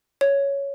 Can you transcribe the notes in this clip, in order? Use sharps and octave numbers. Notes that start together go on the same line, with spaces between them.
C#5